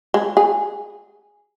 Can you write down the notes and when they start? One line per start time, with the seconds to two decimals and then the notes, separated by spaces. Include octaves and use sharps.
0.14 G#3
0.37 G#4